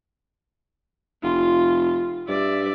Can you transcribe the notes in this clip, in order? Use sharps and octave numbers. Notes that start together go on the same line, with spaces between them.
F1 F4
G2 D5 E5